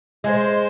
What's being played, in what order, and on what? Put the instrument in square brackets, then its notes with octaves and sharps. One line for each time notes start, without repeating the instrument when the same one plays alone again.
[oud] G#3 [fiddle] C5